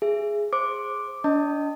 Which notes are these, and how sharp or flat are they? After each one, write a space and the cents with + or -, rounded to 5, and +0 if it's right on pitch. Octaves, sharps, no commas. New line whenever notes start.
G#4 +0 E5 +25
C5 +15 D6 +0
D4 -30 D#5 +5 A5 +35